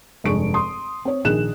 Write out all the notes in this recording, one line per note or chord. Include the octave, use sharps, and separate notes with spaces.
F1 G2 G#3 G#4 C#6 D7
C6 D#6
C4 C#5
A#1 D#3 G#4 F#6 E7